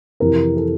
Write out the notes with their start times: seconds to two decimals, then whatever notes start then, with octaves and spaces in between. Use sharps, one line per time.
0.20 F2 C3 E3 A#4
0.56 A4